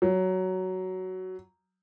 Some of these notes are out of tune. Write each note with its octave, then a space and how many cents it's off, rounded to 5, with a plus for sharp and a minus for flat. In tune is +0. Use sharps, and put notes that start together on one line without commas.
F#3 +10